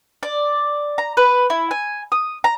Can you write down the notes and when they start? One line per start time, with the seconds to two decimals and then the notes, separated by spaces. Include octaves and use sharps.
0.23 D5
0.98 A#5
1.17 B4
1.50 E4
1.71 G#5
2.12 D#6
2.44 A#5